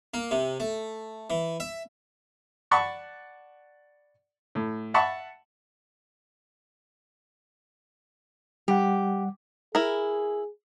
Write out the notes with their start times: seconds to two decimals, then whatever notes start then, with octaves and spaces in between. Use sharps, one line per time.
0.14 A#3
0.31 C3
0.60 A3
1.30 E3
1.60 E5
2.71 D5 F#5 A5 B5 C#6
4.55 A2
4.94 E5 F#5 A5 B5 C#6
8.68 G3 G4 F#5
9.75 E4 G#4 A#4